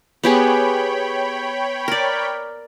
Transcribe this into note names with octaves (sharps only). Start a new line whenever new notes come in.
B3 G4 G#4 C#5 G5 B5
A#4 D5